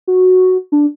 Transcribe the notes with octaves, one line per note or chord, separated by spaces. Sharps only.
F#4
D4